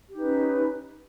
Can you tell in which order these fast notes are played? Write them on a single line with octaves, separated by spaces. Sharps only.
G4 D#4 B4 C#4